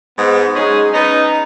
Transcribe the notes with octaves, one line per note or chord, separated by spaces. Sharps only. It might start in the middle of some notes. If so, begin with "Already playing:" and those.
G#2 B3
F#3 G#3 C#4 D#4 G#4
B3 C#4 D#4